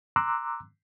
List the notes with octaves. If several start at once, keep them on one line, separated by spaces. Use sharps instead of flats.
A#5 C6 D6 E6 F#6